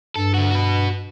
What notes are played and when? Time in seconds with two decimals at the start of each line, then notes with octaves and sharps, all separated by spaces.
0.16 G2 A4
0.34 D3 F#4
0.51 F#4 B4